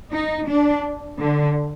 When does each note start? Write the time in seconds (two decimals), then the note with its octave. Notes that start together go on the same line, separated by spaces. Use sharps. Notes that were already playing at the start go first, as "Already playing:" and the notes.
0.11 D#4
0.47 D4
1.20 D3